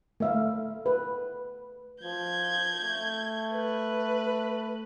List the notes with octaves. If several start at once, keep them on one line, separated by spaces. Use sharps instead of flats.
A3 E5 F5
B4
F3 G6 G#6
A3
B4